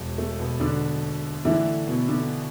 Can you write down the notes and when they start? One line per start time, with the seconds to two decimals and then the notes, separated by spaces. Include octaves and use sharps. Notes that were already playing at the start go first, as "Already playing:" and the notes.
Already playing: E1
0.18 A3
0.39 B2 B3
0.60 D3 D4
1.45 A2 D3 E3 A3 D4 E4
1.87 B2 B3
2.08 D3 D4